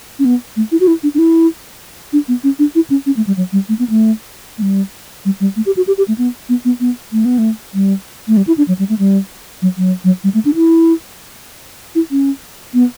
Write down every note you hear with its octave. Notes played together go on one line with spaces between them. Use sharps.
C#4
B3
A3
E4
F#4
E4
D4
D4
E4
D4
B3
C#4
D4
E4
C#4
C#4
A3
G3
F#3
G3
A3
B3
A3
A3
G3
G3
G3
A3
G4
F#4
G4
G4
A3
B3
B3
B3
B3
A3
B3
A3
G3
A3
G3
E4
D4
F#3
G3
A3
G3
F#3
F#3
F#3
G3
A3
D4
E4
E4
C#4
B3